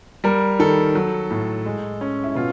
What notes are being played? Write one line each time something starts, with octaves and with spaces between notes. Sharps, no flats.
G3 A#4
D#3 A4
F#3
A2
G#3
C#4
E4
B2 F4